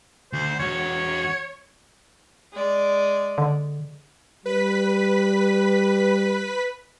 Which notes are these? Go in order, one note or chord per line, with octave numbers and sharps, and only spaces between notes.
D2 C5
E2 F#4 C#5
G#3 D5
D3
G3 B4 B6